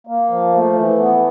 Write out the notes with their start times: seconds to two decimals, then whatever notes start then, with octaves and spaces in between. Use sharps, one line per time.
0.07 A#3
0.29 F3
0.53 A3
0.76 E3
0.99 B3